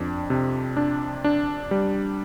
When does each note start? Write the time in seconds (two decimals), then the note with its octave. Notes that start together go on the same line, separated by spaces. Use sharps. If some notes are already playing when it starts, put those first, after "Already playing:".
Already playing: F2 D4
0.30 C3
0.77 D4
1.24 D4
1.71 G3